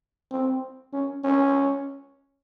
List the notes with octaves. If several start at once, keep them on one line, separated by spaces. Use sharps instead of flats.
C4
C#4
C#4